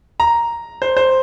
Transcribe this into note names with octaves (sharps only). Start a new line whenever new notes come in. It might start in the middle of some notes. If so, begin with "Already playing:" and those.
A#5
C5
C5